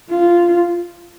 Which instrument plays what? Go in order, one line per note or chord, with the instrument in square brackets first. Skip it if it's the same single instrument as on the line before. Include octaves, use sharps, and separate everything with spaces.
[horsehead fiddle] F4